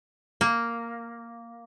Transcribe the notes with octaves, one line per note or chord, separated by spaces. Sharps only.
A#3